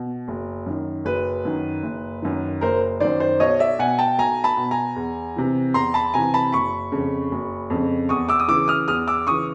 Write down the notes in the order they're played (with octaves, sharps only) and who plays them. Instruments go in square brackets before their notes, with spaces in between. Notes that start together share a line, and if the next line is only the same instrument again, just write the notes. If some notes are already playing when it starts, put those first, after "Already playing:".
Already playing: [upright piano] B2
F#1
F#2 D#3
F#1 B4
F#2 D#3
F#1
F#2 D#3
F#1 A#4 C5
F#2 D#3 C5 D5
C5 D5
B1 C#5 D#5
D5 E5
B2 F#5 G#5
G5 A5
B1 G#5 A#5
A5 B5
B2
G#5 A#5
E2
C3 E3
E2 A#5 C6
A5 B5
C3 E3 G#5 A#5
A5 B5
F#1 B5 C#6
F2 C#3
F#1
F2 C#3
E2 C#6 D#6
D6 E6
D#6
C#3 E3 D6 E6
D#6 F6
E2 D#6 F6
D6 E6
C#3 E3 C#6 D#6